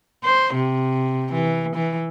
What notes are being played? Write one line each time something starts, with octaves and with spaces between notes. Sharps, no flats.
C5
C3
E3
E3